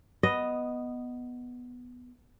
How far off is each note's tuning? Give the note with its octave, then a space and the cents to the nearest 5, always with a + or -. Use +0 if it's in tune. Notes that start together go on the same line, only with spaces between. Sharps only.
B3 +0 D#5 +0